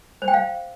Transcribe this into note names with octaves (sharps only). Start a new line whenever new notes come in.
C5
G5
F5